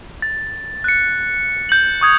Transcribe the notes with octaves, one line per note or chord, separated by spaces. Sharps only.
A6
F#6 C#7
G6 F#7
C#6 D#6 G#6